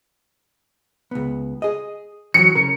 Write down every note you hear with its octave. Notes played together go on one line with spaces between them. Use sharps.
C#2 B3
G#4 D#5
E3 F#3 C#7
C#3 A#4